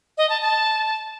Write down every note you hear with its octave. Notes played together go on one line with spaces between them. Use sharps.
D#5
A5
A5